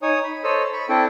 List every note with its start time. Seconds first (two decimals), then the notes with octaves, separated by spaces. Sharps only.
0.02 D#4 C#5 G#5 D#6
0.24 B5
0.44 A4 C5 C#5 D#5 E6
0.73 B5 C#6
0.89 C4 D4 E4 A4 G5